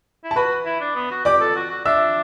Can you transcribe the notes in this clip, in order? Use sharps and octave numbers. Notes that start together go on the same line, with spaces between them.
E4
A5
F#4 B4 B5
E4
D4
B3
F#4
G4 D5 D6
A4
F#4
F#4
D4 E5 E6